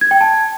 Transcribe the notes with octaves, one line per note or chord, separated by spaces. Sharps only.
G#6
G5
A5